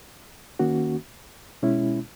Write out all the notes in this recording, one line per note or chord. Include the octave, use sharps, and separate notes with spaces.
D#3 A#3 C#4 F#4
B2 G#3 C#4 E4